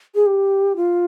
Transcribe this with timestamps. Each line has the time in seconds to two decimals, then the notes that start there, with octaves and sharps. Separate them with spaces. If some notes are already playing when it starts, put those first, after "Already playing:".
0.15 G#4
0.26 G4
0.76 F4